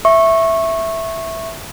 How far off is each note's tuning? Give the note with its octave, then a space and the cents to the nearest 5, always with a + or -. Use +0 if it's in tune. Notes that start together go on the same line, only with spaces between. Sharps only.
E5 +0 C#6 -15